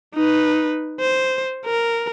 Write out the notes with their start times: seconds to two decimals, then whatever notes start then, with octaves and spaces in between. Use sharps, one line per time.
0.14 D#4 B4
1.00 C5
1.66 A#4